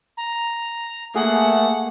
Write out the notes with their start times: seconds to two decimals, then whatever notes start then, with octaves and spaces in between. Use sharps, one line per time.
0.17 A#5
1.15 A3 A#3 G#4 F#5